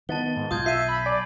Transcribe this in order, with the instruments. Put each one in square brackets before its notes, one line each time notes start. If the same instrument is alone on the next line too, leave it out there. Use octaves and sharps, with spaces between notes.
[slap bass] D#3 [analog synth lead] B3 [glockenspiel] A5 A6 G7
[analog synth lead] G#2
[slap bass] B1 [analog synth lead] F4 [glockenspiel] D#6 G6 G#6
[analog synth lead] E5 [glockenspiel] C7 D#7
[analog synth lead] B5
[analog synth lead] D5 [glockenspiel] G#5